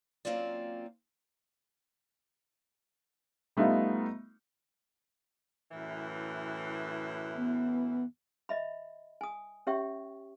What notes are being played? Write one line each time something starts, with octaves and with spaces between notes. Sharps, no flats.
F#3 A#3 C4 C#4 F4 D5
G3 A3 B3 D#4 F4
F#2 A2 E3
B3
D#5 E5 B5
G#5 D#6
C#4 G4 C#5 E5 G5 C#6